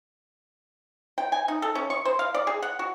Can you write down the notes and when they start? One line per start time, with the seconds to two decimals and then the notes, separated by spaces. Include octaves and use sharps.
1.18 G5
1.32 G#5
1.48 D#4
1.62 A4
1.75 C#4
1.90 C#6
2.05 C5
2.19 F5
2.34 D5
2.47 G#4
2.62 F#5
2.79 F#4